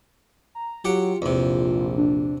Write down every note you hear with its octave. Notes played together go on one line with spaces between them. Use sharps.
A#5
F#3 F4 G4 F#5 G5
A#1 E2 C3
D4